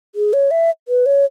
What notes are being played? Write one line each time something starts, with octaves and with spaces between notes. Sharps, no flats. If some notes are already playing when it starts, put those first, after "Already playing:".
G#4
C#5
E5
B4
C#5